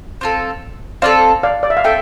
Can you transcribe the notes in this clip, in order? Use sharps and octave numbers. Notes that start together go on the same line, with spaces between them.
C4 F4 A4
C4 F4 A4 D5 F5
D5 F5
D5
E5
F5
C4 F4 A4 E5 G5